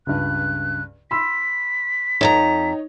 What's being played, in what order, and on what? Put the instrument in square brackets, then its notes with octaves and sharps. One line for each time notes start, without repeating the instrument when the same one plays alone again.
[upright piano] C#2 G2 [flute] F#6
[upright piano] B5 C6 E6 [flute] B6
[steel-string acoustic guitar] F2 A5 A#5 [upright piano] D#4 C#5